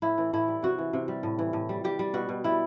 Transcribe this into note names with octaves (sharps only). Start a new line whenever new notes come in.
A2 E4
E3
A2 E4
G3
C3 F#4
E3
C3
G3
A2
E3
A2
G3
G3 G4
G3
B2 F#4
B2
G3 E4